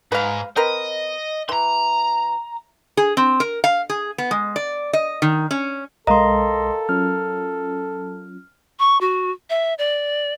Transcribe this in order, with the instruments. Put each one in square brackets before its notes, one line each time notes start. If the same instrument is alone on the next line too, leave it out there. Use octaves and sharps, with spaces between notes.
[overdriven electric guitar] G#2 [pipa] B4 F5
[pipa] C4 A#4 B4 [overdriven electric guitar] D#5
[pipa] E3 [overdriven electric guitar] A#5 C6
[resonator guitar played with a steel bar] G#4
C4
A#4
F5
G#4
B3
G#3
D5
D#5
D#3
C#4
[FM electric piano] B1 G#3 [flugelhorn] A4 [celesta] A#4 F5 A#5 [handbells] D#5 C6
[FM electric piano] F#3 C#4 F4 [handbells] F6
[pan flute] C#6
F#4
E5
D5